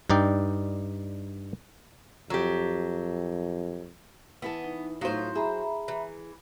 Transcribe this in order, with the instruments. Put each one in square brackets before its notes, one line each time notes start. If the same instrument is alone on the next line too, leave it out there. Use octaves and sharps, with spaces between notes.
[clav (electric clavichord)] G2 D#4 D5 G5
[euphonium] F2 [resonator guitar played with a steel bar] F#3 G4
[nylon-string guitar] E3 B4 A5 [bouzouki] B3
[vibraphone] D#4
[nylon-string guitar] A2 B3 F4 [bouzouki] F#3 C5 [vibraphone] D#4
[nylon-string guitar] G#4 [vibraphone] E5 A#5 B5
[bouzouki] E3